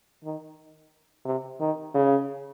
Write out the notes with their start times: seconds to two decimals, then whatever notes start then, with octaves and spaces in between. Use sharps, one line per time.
0.24 D#3
1.25 C3
1.60 D#3
1.94 C#3